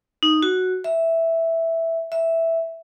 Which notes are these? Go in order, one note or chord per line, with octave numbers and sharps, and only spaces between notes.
D#4
F#4
E5
E5